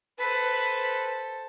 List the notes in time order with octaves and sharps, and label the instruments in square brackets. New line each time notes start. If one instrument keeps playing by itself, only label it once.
[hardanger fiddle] A4 C5 [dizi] B4